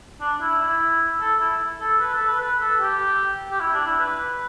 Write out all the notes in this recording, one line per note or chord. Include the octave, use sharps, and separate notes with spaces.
D4
E4
E4
A4
E4
A4
B4
A4
B4
B4
A4
G4
G4
E4
D4
E4
B4